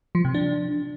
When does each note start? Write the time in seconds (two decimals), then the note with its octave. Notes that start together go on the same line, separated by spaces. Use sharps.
0.15 F3
0.25 C3
0.34 D4